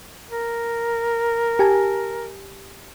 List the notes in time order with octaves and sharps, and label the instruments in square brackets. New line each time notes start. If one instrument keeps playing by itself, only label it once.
[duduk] A#4
[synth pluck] G4 G#5 A5